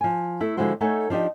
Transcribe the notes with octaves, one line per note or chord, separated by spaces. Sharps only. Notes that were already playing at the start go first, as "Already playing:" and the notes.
F3 G#5
A3 E4 A4
D3 F3 G#3 E4 F#4 C5
A3 D#4 A4 C#5 F#5 G#5
F3 D4 D#4 G4 D#5